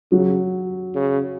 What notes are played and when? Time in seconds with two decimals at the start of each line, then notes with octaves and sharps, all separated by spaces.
0.11 C#3 F#3
0.95 C#3